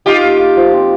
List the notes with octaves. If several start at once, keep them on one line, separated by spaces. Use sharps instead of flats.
D#4 F4 G4
A#3
A#3
F3
C4